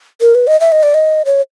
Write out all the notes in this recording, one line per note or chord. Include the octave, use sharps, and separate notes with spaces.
A#4
B4
D#5
E5
D#5
D5
D#5
C#5